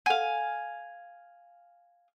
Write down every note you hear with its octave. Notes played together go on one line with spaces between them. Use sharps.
A4 F5 F#5 G#5